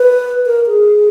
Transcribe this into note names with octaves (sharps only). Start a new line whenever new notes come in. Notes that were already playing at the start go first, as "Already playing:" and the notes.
Already playing: B4
A#4
G#4